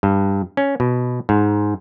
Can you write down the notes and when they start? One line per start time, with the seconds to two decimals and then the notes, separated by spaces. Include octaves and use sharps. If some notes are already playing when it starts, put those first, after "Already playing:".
0.03 G2
0.57 C#4
0.80 B2
1.29 G#2